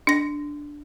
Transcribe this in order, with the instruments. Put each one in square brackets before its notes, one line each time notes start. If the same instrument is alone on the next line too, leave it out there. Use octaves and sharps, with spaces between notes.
[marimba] D4 A#6